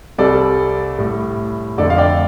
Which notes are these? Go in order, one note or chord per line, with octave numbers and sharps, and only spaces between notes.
C2 C3 G3 A4 D5
A2 G3
F2 D3 A3 A4 D5
F5
D5 G5